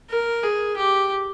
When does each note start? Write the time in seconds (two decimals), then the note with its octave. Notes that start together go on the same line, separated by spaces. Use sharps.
0.10 A#4
0.43 G#4
0.77 G4